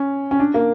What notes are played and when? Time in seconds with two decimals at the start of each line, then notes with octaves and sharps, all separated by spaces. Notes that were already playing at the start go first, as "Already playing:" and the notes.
Already playing: C#4
0.31 C#4
0.40 D4
0.54 A#3